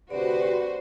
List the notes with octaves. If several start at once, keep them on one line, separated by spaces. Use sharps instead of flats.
D2 C3 F#4 G4 B4 C5 D5